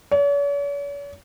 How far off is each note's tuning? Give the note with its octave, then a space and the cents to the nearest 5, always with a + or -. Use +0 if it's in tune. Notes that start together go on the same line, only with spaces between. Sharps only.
C#5 +45